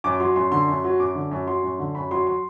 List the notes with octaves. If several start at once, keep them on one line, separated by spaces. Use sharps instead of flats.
F#2 D6
F#3 C6
F#2 C6
D3 C6
F#2
F#3
F#2 D6
D3
F#2
F#3 C6
F#2
D3
F#2 B5
F#3 C6
C6